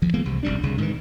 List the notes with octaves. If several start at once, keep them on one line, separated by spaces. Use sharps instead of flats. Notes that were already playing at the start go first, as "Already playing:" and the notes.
D2 F3
E3 G#3 A#3 B3
C2 C3
E1 C2 G3 D4
C2 C#3
G#2 D#3 E3